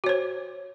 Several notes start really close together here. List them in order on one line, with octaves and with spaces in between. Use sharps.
F#4 C#5 C5